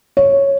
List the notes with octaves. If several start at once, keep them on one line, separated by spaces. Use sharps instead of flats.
C#5